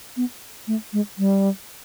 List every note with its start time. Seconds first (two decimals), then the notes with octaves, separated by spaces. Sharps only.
0.17 B3
0.67 A3
0.93 G#3
1.18 G3